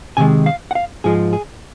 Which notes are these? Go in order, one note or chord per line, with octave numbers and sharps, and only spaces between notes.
C3 D#3 G#3 G#5
F5
F#5
F5
G#2 F3 G#3 G#4
G#4